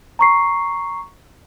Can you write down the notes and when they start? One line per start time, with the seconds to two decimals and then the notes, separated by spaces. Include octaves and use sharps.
0.19 A#5 C#6 C7